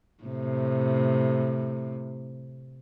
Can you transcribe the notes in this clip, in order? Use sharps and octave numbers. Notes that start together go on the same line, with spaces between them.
A2 C3